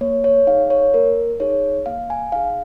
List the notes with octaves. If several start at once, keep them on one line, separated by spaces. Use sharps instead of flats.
A#3 C#5
C#5
D#4 G#4 F5
C#5
A#3 A#4
D#4 G#4 C#5
A#3 F5
G#5
D#4 G#4 F5